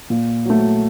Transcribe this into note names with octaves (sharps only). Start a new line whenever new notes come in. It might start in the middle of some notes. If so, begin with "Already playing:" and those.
A#2
F#3 A3